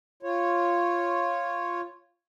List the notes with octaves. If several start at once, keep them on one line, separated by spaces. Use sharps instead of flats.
F4 C#5